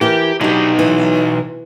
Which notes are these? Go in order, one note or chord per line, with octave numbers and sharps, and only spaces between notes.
E3 E4 G4 A#4
B2 F#3 D4 D#4 G4
E3